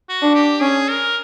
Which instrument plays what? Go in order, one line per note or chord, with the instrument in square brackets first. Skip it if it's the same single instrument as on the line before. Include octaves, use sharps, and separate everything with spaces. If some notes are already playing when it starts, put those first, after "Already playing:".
[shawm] F#4
[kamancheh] D4
[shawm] G4
[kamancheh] C#4 [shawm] G#4
[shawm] A#4